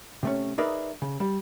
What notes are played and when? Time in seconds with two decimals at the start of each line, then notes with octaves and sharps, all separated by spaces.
0.23 C3 A3 C#4
0.58 D#4 G#4 A#4 B4 D5 E5
1.02 C#3
1.20 G3